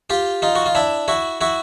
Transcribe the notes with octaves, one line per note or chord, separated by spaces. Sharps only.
F4 G4
D#4 F4
F#4
F4
D4 E4
E4 F#4
E4 F#4